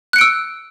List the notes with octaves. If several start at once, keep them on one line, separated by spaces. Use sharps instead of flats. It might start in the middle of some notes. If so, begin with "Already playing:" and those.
E6 F#6 C#7 D7